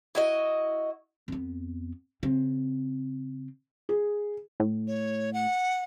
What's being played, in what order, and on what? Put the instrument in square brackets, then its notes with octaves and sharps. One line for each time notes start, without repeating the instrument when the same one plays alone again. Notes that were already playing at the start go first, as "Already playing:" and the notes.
[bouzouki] E4 F#4 D#5
[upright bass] F2 B3
C#3 C4
[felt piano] G#4
[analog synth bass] A2
[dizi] C#5
F#5